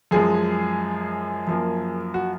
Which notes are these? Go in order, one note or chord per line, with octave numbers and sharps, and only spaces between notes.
F#2 F3 G#3 G#4
F#2 F3 A#3
F#4